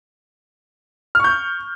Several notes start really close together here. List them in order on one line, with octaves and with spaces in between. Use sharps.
F6 C#6 G6